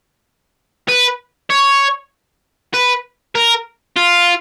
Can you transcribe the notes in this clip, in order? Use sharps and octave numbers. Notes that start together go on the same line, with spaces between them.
B4
C#5
B4
A#4
F4